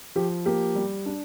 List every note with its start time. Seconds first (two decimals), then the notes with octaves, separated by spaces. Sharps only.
0.16 F3 G4
0.46 A#3 G4
0.75 G3
1.06 D4